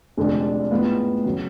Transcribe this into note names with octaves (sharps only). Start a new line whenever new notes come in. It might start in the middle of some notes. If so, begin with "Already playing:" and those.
F1 F2 D3 G#3 D4
A2 G#3 B3 F4
C#3 F#3